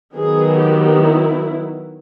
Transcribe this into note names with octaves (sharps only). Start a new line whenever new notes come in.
D#3 F#3 B3 G#4
G4
E4